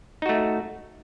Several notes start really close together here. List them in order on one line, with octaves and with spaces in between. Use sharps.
D#4 F#4 A3